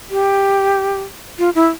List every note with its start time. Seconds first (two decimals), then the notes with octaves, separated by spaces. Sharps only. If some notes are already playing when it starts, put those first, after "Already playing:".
0.10 G4
1.39 F4
1.55 E4